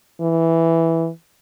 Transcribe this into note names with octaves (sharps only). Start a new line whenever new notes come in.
E3